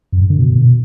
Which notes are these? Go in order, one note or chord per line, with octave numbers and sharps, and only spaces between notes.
F#2
G2
D3
B2